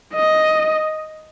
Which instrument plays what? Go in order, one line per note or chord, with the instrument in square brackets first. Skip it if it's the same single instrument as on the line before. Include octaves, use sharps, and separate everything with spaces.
[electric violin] D#5